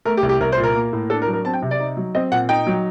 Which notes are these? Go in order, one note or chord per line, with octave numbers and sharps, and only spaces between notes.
A3 A#4
G4
C2
G4
C2 A#4
C5
A#2
A#4
A#3
A2
D4 A4
A#4
F#3
A#4
C4 A5
G5
C3
D5
D#4
F#3
C4 D#5
A#2 F#5
D#4 G5
F#3